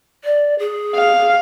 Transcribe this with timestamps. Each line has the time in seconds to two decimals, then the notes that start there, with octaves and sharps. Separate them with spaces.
0.24 D5
0.59 G#4
0.96 F5